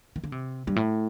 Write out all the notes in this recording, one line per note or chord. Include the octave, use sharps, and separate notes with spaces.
D#3
D3
C3
G2
A2